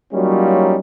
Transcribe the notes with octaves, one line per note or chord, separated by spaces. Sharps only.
F#3 G3 A#3 C#4 D#4 F4